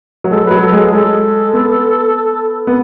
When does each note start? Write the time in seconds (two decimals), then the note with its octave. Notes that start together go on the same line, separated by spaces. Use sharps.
0.24 F#3
0.31 G#3 A4
0.46 F#3 B4
0.62 A4
0.72 G#3 A4
0.86 G#4
0.92 G#3 A4
1.53 B3
2.67 B3